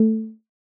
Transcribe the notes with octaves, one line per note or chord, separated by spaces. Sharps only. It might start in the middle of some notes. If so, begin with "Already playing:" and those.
Already playing: A3